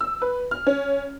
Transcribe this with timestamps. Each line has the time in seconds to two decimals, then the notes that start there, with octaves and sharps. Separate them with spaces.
0.01 E6
0.22 B4
0.51 F6
0.67 C#4